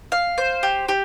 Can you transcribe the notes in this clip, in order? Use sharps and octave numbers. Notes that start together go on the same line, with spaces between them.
F5
C5
G4
G4